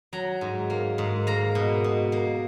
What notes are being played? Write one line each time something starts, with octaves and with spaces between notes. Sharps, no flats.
F#3 A#5
G#2
A#3
G#2
A#3 A#5
B2
B2
A#3